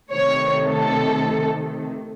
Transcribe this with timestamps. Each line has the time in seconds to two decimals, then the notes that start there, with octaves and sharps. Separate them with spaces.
0.11 C3 D#3 A3 C#5
0.67 A4